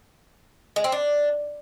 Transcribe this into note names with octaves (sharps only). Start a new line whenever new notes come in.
G#3
C4
D4